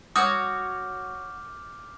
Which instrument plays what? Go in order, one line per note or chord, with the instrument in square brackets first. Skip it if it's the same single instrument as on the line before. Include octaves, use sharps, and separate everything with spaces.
[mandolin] F#4 C#5 [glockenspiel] D6 F6 G6 [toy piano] D#6